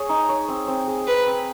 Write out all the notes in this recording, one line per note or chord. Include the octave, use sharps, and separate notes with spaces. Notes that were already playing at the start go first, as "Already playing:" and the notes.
Already playing: G#4 C#5
D#4
C#5
C4
C4
G#4
C4 B4
C4